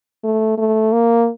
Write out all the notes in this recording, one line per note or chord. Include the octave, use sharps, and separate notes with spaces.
A3
A3
A#3